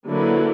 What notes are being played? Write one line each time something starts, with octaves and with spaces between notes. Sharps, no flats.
D3 F#3 A#3 E4 B4